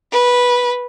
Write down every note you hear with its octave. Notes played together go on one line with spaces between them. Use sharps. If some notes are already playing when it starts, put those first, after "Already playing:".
B4